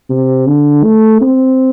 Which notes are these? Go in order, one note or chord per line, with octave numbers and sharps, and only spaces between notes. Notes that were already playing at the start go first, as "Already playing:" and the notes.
C3
D3
A3
C4